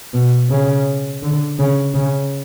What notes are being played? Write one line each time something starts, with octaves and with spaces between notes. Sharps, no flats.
B2
C#3
D3
C#3
C#3